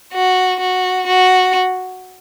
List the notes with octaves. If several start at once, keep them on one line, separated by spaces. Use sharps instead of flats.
F#4
F#4
F#4